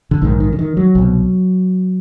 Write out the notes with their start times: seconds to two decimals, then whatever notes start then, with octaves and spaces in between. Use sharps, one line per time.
0.11 D3
0.22 A#1 G#2 D#3
0.40 D#3
0.53 D3
0.59 D#3
0.77 F#3
0.95 C2 B2